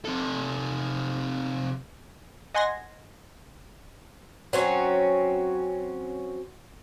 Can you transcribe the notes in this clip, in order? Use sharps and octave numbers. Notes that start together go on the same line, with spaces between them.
C3 A4
D#5 F#5 G#5 C6 G#6 A#6
F#3 C4 C#4